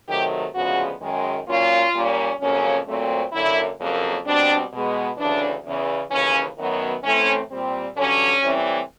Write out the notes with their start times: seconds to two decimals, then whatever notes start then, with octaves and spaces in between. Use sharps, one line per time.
0.09 C3 D#3 F#3 A3 G4
0.54 D2 C#3 F3 G#3 B3 F#4
1.01 F#2 D#3 G#3
1.48 A#2 F#3 A#3 C#4 F4
1.94 A#2 G3 A#3 C#4
2.40 F2 C#3 F#3 A#3 C#4
2.87 A#2 F#3 A3 C4
3.33 F#2 D3 F#3 A#3 E4
3.80 F2 C#3 F#3 A#3
4.26 B2 G3 C4 D4
4.72 B2 G#3 B3
5.18 D2 C#3 E3 D4
5.65 E2 C#3 E3
6.11 D#2 C#3 E3 C#4
6.57 F#2 D#3 F#3 B3
7.03 A2 E3 A3 C4 C#4
7.50 A#2 G3 C4
7.96 G2 D3 F#3 C#4
8.42 A2 E3 G3 C4